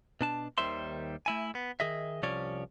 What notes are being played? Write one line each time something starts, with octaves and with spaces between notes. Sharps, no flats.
B2 D4 A5
D#2 D#3 G3 C5 E5 C6
A3 E4 G#5
B3
D#3 G#4 D#5 E5
C2 C3 F3 C#4 C#5 D5